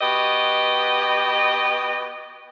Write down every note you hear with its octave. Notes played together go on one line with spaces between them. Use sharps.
B3 F#4 G4 B4 D#5